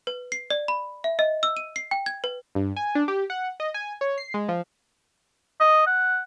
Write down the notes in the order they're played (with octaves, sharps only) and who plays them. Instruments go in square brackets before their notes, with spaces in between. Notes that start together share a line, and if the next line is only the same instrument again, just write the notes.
[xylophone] B4
C7
D5
B5
E5
D#5
E6
D#7
C7
G5
G#6
B4
[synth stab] G2
G#5
D4
G4
F#5
D#5
G#5
C#5
C7
G#3
F3
[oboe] D#5
F#5